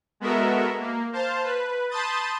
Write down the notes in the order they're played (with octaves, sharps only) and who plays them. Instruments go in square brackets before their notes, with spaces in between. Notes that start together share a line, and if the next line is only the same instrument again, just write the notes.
[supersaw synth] G#3 B3 F#4 A4 A#4 E5
A#3
C5 F5 A5
B4
A5 B5 C6 D#6 G6 A6